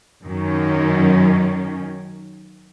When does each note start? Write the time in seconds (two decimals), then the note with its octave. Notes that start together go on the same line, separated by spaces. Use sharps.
0.24 F#2 D#3 C#4